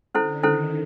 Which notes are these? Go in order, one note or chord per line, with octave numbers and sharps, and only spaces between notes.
D3 C#4 E4 A4 C5
D#3 C#4 E4 A4 C5